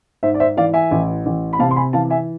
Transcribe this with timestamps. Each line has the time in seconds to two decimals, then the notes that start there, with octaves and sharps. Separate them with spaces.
0.23 G#2 C5 E5
0.34 D5
0.40 C5 E5
0.57 E3 D5 F5
0.73 E5 G#5
0.91 A1
1.26 A1
1.53 B5
1.59 C3 F5 A5
1.71 C6
1.76 G#5 B5
1.93 E3 F5 A5
2.10 E5 G#5